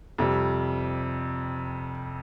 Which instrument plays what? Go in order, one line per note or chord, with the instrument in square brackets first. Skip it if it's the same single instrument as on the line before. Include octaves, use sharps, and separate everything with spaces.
[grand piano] F2 C3 G3